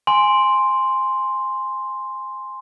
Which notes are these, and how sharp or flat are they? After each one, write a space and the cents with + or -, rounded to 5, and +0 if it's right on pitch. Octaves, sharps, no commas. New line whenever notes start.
G#5 +0 C6 +0